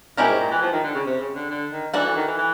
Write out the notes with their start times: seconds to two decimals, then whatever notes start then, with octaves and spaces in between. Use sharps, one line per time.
0.17 B2 G#3 C#4 E4 G4 A#4
0.28 G#2
0.40 A#2
0.51 E3
0.62 F3
0.72 D#3
0.84 D3
0.95 C#3
1.06 C3
1.20 C#3
1.35 D3
1.50 D3
1.72 D#3
1.94 E3 D4 F#4 A4
2.05 E3
2.16 D#3
2.28 E3
2.38 E3